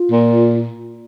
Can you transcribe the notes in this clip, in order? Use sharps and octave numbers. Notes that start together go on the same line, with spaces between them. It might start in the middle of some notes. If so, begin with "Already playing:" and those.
Already playing: F4
A#2